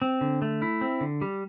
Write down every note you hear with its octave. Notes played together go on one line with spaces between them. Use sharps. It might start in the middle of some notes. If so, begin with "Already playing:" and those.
C4
D3
A3
E4
C4
D3
G3